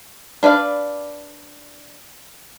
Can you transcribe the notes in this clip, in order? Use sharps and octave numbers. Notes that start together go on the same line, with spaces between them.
D4 B4 D5 F5